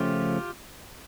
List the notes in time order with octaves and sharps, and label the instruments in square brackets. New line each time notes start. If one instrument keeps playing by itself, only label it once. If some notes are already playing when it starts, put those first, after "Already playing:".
Already playing: [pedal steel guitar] C#3 F3 A3 C#4 F4 G4